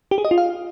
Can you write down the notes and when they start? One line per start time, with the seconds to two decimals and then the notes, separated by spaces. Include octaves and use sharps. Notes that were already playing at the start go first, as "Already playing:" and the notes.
0.11 G4
0.18 G#4
0.25 D#5
0.31 F4
0.38 F5